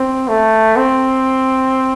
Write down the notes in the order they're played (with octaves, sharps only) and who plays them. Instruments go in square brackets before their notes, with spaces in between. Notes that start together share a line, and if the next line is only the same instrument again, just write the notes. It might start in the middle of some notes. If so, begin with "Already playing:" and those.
Already playing: [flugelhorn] C4
A3
C4